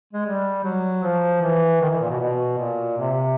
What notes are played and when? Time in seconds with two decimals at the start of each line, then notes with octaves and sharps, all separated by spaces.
0.13 G#3
0.26 G3
0.64 F#3
1.03 F3
1.42 E3
1.81 D#3
1.90 E3
2.00 A#2
2.10 B2
2.20 B2
2.58 A#2
2.98 C3